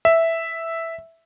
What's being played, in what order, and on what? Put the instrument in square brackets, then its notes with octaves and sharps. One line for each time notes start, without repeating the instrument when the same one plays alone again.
[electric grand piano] E5